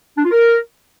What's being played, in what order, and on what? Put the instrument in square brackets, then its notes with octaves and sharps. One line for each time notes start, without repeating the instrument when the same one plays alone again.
[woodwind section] D4
F4
A#4